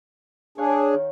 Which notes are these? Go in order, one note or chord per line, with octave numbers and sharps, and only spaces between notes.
D4 G#4 C#5 F5 F#6
C#5 G5
D#3